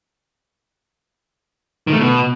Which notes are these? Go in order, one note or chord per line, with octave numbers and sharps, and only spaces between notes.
D#3
A3
B2